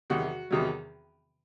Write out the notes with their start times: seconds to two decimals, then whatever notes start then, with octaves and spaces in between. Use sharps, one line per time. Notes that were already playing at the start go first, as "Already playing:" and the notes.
0.10 E2 C3 D#3 F#3 F#4
0.51 E2 C3 D#3 F#3